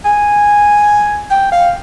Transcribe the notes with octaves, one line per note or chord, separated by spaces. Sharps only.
G#5
G5
F5